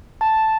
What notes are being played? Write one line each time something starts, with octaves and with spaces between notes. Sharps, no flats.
A5